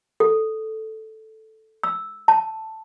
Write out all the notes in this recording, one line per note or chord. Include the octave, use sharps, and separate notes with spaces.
A4
E6
A5